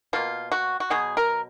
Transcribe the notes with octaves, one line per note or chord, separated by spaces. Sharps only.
B2 A#3 F4
F#4
F#4
B2 F#3 B3 G#4
A#4